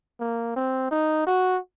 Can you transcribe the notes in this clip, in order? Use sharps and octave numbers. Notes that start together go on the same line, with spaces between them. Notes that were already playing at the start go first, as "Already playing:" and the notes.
A#3
C4
D#4
F#4